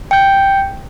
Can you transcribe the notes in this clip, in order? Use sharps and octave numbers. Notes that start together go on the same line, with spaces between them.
G5 G6